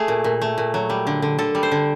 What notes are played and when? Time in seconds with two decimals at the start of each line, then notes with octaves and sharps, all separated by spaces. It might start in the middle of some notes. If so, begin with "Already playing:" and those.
Already playing: A3 G#4
0.08 A#2
0.24 A#2
0.42 A3
0.58 A#2
0.74 F#3
0.90 G3
1.07 D3
1.22 D3
1.39 D3 A4
1.55 G3
1.63 C5
1.72 D3